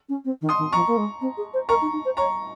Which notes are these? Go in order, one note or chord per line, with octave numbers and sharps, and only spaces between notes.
C#4
C4
D#3
C6 D#6
D#3
F3 A#5 C#6
A#3
G#3
C4
G#4
C5
A#4 A#5 C#6
D#4
D#4
C5
C#5 A#5 C#6